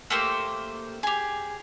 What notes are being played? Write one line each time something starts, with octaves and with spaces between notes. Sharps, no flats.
A3 A#3 G4 C5
G4 G#4